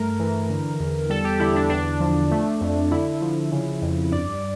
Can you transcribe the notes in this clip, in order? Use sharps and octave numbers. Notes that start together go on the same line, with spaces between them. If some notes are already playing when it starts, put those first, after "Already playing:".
Already playing: G2 A3 A#4
E3
D3
E2
G3 A4
G4
D3 E4
D4
E2 D4
F3
A3
F2
D3 E4
F3
C#3
F2
G2 D5